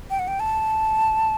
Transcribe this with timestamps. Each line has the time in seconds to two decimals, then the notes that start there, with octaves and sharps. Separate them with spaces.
0.10 G5
0.19 F#5
0.28 G5
0.40 A5